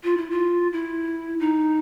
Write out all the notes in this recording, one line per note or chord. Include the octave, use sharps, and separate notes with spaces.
F4
E4
F4
E4
D#4